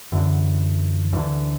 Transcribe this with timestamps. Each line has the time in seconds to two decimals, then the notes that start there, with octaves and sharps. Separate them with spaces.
0.12 F#2 D3 E3
1.12 D2 D3 E3